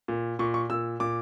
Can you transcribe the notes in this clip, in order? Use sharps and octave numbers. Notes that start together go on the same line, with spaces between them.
A#2
A#2 C#6
C#6
A#2 E6
A#2 D6